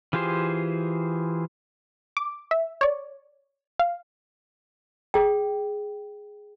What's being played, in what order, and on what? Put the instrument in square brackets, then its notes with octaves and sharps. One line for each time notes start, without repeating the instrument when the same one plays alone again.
[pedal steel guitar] E3 F4 G4 G#4 C5
[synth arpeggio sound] D6
E5
C#5 D5
F5
[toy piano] G#4 G5